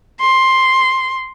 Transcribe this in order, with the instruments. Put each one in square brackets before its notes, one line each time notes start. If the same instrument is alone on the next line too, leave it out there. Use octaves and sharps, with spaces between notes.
[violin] C6